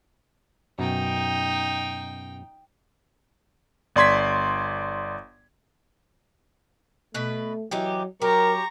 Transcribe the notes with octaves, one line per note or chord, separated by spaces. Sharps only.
F#2 B2 D#4 G5
G1 D5 C6 G#6 B6
B2 A3 B4
E3 F#3 D#4 G4
F#3 G4 A#4 A#5 C#6